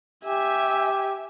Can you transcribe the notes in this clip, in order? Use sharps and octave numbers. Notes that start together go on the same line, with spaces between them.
G4 E5 G#5